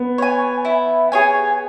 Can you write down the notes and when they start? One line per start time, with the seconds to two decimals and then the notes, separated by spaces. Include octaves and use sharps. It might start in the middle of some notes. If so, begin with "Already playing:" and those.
Already playing: B3
0.18 C#5 G#5
0.65 E4
1.12 G#4 C#5 G#5